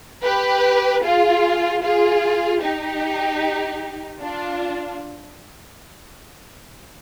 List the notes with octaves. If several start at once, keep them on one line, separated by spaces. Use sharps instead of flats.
G4 B4
F4 G#4
F4 G#4
D#4 G4
D4 F4